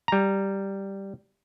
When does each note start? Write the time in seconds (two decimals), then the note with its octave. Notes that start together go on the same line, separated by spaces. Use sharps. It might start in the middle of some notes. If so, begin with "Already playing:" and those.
0.08 G3 A#5